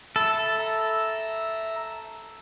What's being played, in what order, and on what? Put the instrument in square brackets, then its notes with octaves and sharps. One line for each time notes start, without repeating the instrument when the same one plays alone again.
[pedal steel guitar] A4 [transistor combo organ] E5 B5
[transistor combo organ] E5 A#5